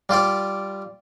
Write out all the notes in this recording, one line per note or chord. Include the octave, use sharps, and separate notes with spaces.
G3 F4 G4 D5